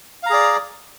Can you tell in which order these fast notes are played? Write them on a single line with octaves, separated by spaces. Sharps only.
F5 A#5 G#4 D5